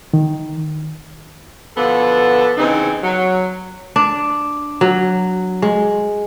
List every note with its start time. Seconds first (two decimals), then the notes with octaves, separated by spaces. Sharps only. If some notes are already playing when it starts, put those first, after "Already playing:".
0.13 D#3
1.77 B2 D3 F3 B3 A4
2.57 C#3 E3 C4 D#4
3.02 F#3
3.96 D4
4.81 F#3
5.62 G#3